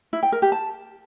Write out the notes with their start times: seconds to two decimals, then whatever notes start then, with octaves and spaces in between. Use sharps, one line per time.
0.13 E4
0.23 G5
0.32 A#4
0.42 G4
0.52 A5